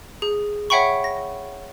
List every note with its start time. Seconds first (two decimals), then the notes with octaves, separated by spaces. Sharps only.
0.22 G#4
0.70 C#5 E5 F#5 G5 B5 C#6
1.04 A#6